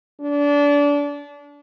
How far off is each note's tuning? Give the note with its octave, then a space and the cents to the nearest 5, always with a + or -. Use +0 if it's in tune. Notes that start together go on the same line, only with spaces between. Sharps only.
D4 -25